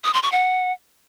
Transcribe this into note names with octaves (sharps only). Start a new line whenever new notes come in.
D#6
C6
C#6
F#5